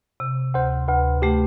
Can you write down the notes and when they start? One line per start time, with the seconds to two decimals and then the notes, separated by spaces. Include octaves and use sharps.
0.20 C3
0.54 D2 C5
0.88 D2 B4
1.22 A3 G4